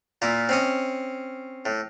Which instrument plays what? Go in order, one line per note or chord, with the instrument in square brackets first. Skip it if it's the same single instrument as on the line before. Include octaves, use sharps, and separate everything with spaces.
[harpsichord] A#2 A#3 E4
C4 C#4 D#5
A2